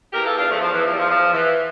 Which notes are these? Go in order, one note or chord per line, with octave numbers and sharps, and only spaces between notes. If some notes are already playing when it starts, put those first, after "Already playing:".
E2 E3 G4 A#4
F4 A4
D4 F4
F3 A3
F3
E3
F3
G3
F3
F3
E3